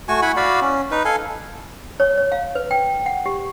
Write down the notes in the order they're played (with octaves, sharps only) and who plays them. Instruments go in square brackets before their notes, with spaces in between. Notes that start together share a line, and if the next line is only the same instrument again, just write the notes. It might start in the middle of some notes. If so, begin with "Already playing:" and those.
[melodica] A3 F#4 G#5 C#6
E4 F#5 G#5 B5
F#4 D5 F5 B5
C#4
D#4 B4
A4 F5 G#5
[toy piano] C#5
C#5
F5
B4
G5
F#5
G4